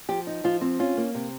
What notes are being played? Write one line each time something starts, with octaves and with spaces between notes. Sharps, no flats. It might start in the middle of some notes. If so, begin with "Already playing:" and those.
F3 G4
D#4
F3 F4
C4
C#4 F4
A#3
C3